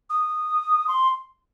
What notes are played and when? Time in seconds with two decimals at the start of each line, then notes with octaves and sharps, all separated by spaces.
0.10 D#6
0.88 C6